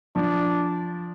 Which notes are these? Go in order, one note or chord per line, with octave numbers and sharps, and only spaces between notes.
F3 D4